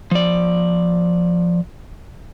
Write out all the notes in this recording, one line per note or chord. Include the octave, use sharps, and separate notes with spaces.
F3 D5